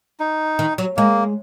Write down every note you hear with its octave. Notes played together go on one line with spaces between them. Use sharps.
D#4
D#3
F#3
G#3 A#3